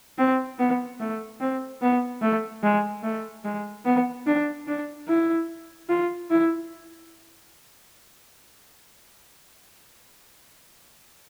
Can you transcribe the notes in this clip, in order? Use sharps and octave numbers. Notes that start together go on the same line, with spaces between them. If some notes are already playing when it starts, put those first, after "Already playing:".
C4
B3
A3
C4
B3
A3
G#3
A3
G#3
B3
D4
D4
E4
F4
E4